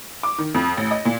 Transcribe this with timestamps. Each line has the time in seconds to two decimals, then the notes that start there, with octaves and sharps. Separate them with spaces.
0.23 D6
0.38 D#3
0.54 F2
0.77 A1
0.91 D#5
1.05 A#2